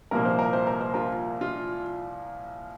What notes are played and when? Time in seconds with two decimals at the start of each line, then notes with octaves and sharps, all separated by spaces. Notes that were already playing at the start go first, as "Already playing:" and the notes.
0.11 C2 A#2 F3 A#3 A#4
0.25 C5
0.39 A#4
0.53 C5
0.67 A#4
0.81 C5
0.94 F4 A#4
1.41 F4